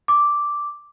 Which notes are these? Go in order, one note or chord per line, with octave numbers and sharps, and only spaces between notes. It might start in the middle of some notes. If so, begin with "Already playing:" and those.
D6